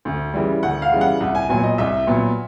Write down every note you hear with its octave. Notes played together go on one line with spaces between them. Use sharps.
D2
C#3 E3 G3
D2 F#5
F5
C#3 E3 G3
F#5
C2
G#5
A#2 F#3 B3 G#5
D#5
C2 E5
A#2 F#3 B3